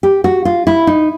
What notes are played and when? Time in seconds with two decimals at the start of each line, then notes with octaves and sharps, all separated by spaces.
0.03 G4
0.24 F#4
0.45 F4
0.67 E4
0.87 D#4